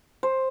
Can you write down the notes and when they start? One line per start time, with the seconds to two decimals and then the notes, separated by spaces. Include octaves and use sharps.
0.23 C5